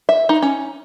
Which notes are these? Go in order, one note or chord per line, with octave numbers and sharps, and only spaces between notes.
E5
D#4
C#4